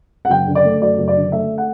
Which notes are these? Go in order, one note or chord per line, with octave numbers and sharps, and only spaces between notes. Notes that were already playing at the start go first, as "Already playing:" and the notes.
F#5
F#1 G5
D3
D5
A3
F#2 D5
F#1
D5
D3
A3 E5
F#5